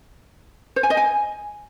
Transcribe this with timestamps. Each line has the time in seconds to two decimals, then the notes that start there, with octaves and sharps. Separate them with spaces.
0.76 C5
0.83 G#5
0.90 D#5
0.97 G#5